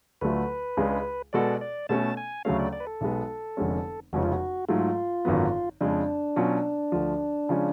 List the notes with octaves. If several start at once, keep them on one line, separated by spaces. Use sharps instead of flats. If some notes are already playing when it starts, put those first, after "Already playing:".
D2 D3 F#3 A3 F4 B4
C#2 C#3 G#3 D4
B2 G#3 B3 F#4 A4 D5
D5
B2 A3 C#4 A5
G#5
D2 C#3 F#3 A3 C#4 F5
D5
D5
B4
A4
B1 B2 G#3 B3
F1 F2 D3 G#3 C#4
F1 F2 C#3 G#3 C#4 F#4
F4
F#4
G#2 F#3 A3 F4
G#1 F#2 D3 F#3 B3
F2 C#3 G#3 D4
B2 F#3 C#4 F4
D2 D3 F3
C#3 F3 G#3 C#4